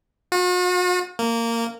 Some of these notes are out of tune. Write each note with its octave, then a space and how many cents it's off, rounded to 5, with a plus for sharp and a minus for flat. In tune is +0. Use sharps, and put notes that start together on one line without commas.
F#4 -45
A#3 -15